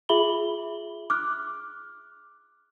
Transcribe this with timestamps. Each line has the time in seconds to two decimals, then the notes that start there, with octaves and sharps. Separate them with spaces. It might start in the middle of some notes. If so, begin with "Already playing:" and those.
0.09 F4 G#4 E5 B5 F#7 G7
1.10 D6 F6 F#6